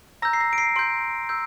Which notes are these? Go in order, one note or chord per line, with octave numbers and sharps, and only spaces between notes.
A#5 E6 G6 A#6
C7
A#6
D7
C7
C6 G6 D7
E6 G6